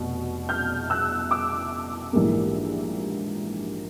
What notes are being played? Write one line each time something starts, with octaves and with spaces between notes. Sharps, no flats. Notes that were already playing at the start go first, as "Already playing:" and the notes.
Already playing: F1 B2
F6 G6
E6 F#6
D6 E6
A#1 G#2 E3 G3 A#3